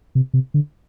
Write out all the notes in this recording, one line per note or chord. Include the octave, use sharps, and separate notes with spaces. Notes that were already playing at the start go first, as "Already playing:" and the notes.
C3
C3
D3